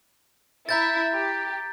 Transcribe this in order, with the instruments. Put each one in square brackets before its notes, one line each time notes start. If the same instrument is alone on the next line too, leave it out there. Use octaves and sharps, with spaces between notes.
[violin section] E4 E5 [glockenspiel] A#5 G6 A6
[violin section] G4